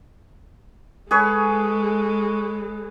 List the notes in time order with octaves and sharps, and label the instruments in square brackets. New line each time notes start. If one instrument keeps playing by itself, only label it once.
[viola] G#3 A4 [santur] G#4 B4 C#5